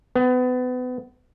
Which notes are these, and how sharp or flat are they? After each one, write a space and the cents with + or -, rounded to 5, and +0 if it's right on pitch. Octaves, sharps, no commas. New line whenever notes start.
B3 +30